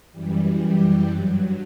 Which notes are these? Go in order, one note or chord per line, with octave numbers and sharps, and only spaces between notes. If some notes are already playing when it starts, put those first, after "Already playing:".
F#2 E3 G3
G4
G2 F#3